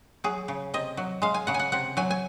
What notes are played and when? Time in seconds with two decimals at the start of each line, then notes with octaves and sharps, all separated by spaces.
0.24 F#3 G#4
0.48 C#3
0.74 C3 D#5
0.97 F#3
1.22 G#3 F5
1.34 G#5
1.47 C#3 F#5
1.54 G#5
1.59 F#5
1.72 C3 F#5
1.97 F#3 G#5
2.11 G#5